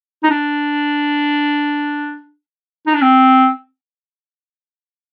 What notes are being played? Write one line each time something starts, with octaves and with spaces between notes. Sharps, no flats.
D#4
D4
D#4
D4
C4